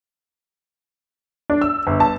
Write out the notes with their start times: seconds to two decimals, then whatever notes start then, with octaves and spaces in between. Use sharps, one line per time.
1.50 D4
1.62 E6
1.87 G1
2.00 A5